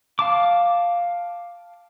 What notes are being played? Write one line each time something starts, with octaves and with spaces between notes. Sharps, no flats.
F5 A5 D6